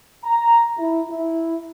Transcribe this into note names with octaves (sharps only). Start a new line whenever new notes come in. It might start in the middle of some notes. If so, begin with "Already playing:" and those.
A#5
E4
E4